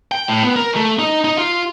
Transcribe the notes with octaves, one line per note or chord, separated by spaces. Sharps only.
G5
A2
B3
A#4
A3
D#4
D#4
F4